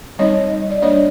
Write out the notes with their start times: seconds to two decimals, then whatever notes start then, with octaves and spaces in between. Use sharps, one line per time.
0.19 G3 C4 D#4 C#5 D#5
0.71 D5
0.82 G3 A#3 D4 C#5 D#5